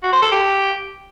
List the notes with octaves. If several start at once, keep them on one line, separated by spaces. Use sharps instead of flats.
F#4
C5
A4
G4